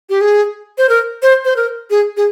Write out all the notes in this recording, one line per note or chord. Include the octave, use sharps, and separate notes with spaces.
G4
G#4
C5
A#4
C5
C5
A#4
G#4
G#4